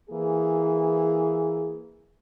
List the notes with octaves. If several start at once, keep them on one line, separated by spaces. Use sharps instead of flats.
E3 A#3 G#4